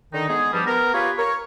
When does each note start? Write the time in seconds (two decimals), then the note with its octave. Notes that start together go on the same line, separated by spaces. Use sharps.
0.13 D3 D#3 D#4
0.28 G#3 B3 G#4
0.53 G2 F3 G3
0.66 B3 A#4
0.94 F4 G4 G#4 B4 C#5
1.17 A#4 C#5